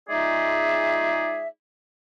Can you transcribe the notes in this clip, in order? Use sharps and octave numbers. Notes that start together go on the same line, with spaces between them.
G#3 D#4 F4 G#4 D5 E5